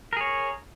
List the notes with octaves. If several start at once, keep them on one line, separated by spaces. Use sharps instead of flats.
G#4 A#4 C#5